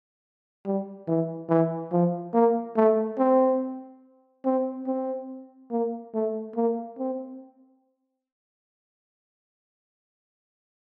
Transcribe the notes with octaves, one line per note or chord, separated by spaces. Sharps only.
G3
E3
E3
F3
A#3
A3
C4
C4
C4
A#3
A3
A#3
C4